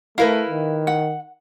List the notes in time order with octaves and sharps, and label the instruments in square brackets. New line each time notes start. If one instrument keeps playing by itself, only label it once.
[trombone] A3 [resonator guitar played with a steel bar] E4 A#4 B4 [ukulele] F5
[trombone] D#3
[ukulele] F#5